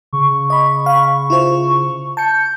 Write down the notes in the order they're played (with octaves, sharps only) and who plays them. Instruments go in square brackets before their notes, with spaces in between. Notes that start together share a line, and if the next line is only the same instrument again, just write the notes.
[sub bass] C#3 [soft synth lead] C#6
[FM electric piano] D#5 B5
F5 B5
E4 F4 C5
[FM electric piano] A5 C#7 [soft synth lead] G6